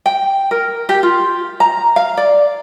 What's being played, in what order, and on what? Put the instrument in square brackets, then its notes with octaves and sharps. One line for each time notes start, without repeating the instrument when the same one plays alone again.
[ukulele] G5
A#4
G4
F4
A#5
F5
D5